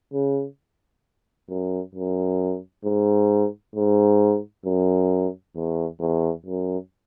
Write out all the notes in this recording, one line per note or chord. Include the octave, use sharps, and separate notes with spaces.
C#3
F#2
F#2
G#2
G#2
F#2
E2
E2
F#2